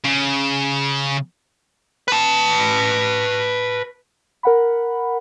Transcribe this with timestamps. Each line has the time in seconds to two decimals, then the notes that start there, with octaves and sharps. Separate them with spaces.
0.04 C#3
2.08 B4 A5
4.43 A#4 F#5 B5